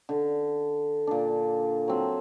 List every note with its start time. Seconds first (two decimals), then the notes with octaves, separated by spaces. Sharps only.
0.09 D3
1.07 A#2 D4
1.88 F#3 C4